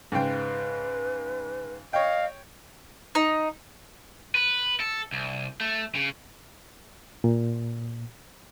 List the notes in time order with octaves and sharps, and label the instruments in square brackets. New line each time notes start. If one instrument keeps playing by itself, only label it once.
[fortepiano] G#2 C#3 G5 [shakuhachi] B4
[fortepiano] C#5 G5 [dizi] D#5 [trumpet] F5
[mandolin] D#4
[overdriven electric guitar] B4
A4
C2
A3
C#3
[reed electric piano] A#2